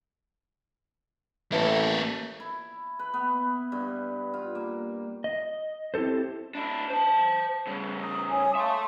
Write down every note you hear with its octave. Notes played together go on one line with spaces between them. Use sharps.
A1 A#3 A4 B4 E5
E4
B4
B3
G2
F4
A#3
D#5
C4 E4 G4 A4 C5
D4 E4
C5 A5
C#3 G3
A#5 D#6
C#5 G#5 D#6
E5 F5 A5 C6 C#6